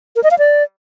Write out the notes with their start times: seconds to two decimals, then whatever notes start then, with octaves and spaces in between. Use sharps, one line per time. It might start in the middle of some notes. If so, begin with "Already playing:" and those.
0.16 A#4
0.23 D#5
0.31 F5
0.38 D5